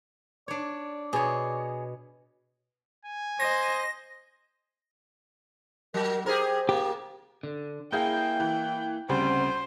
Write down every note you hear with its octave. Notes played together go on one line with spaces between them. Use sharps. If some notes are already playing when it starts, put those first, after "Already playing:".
D4 C#5 D5
B2 G#4 C#5
G#5
C5 D#5 A#6
F#3 A#4
G4 G#4 A#4 C5
A#3 G4
D3
A#3 E4 G#4 F5 G5 G6
E3
D2 C#3 G3 C4 C5